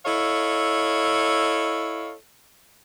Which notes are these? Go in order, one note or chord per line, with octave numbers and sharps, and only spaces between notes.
E4 A4 C#5 D#5 F5